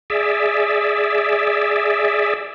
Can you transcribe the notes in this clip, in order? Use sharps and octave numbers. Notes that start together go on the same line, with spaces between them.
G#4 D5 E5